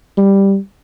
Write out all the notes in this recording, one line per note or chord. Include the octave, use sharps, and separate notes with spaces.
G3